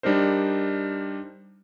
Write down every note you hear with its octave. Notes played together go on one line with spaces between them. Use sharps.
G3 D4 D#4 A#4 C5